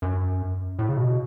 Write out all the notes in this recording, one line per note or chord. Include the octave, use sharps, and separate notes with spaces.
F#2
A2
C#3
B2